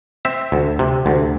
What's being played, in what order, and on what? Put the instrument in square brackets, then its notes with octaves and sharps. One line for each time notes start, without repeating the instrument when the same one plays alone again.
[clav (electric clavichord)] C4 E5
D2
C3
D2